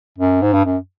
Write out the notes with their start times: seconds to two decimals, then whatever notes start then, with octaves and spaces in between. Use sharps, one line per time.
0.19 F#2
0.42 G#2
0.53 G2
0.65 F#2